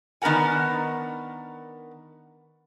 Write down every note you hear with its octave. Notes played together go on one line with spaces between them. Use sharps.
D#3 B3 D4 A#4 F#5 G#5